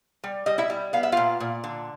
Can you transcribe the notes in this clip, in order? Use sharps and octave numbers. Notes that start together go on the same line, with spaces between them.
G3
G3 D#5
E4 E5
G3
B3 F5
E5
A#2 F4 F5
A#2
D3